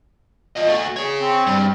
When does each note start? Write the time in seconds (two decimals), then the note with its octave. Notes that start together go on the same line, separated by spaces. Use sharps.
0.56 F4 D#5
0.67 A3 F#4
0.96 G#4 C#5
1.20 C4
1.47 G2